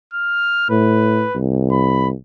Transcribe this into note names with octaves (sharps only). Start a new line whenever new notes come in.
F6
A2 B4
C2
B5